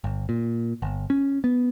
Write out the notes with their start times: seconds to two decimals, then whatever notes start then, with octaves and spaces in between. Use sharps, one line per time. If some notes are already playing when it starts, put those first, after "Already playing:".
0.04 G1
0.29 A#2
0.82 G1
1.10 C#4
1.44 B3